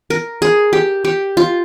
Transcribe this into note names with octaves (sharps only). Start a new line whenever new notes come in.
A#4
G#4
G4
G4
F4